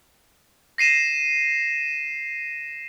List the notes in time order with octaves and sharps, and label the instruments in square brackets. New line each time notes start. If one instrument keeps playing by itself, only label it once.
[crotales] A#6 C7 D#7 E7